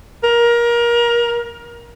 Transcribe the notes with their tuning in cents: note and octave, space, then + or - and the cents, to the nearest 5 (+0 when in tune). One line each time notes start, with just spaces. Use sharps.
A#4 +25